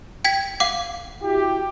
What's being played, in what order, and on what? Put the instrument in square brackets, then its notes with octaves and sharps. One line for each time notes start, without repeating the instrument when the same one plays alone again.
[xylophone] G5 G#6 B6
F5 F#5 D6
[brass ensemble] E4 F#4 G4